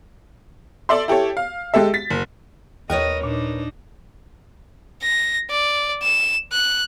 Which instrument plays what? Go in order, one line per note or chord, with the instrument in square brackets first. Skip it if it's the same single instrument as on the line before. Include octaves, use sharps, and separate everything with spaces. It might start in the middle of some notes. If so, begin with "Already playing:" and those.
[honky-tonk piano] A4 D5 E5 C6
E4 G4 A4 C#5
F5
G#3 G4 A4 E5
A6 B6
F#1
[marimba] D#2 [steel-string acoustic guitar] A#4 B4 C#5 [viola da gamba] D#5
[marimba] A#2 [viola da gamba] D4 D#4
[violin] A#6
D5
E7
F#6